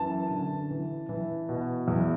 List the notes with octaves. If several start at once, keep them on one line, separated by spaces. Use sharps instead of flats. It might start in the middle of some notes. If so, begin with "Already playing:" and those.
Already playing: F#2 E3 A5
D3
E3
E3
B2
E2